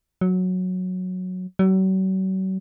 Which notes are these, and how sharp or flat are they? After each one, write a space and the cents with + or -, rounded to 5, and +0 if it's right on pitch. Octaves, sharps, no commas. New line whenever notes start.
F#3 -10
F#3 +40